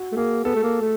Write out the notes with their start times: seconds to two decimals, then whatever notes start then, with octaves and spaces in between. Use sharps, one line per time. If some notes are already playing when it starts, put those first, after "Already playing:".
Already playing: F#4
0.12 A3
0.16 A#3 G#4
0.44 B3 A4
0.56 A3
0.63 A#3
0.81 A3